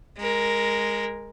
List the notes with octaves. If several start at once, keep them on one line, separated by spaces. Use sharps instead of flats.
G#3 A#4